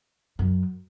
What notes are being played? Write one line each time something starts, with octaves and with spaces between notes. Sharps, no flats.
F#2